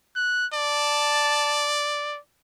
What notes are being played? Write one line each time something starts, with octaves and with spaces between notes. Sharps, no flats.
F#6
D5 A5